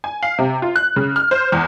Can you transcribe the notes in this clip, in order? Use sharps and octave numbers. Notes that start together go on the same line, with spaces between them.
G#5
F5
C3
F4
F#6
C#3
F6
C5
E2